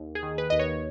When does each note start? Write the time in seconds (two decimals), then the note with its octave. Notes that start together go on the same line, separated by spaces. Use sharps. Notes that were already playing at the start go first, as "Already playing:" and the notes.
Already playing: D#2
0.15 G#4
0.23 D#3
0.38 B4
0.50 D#2 D#5
0.59 C#5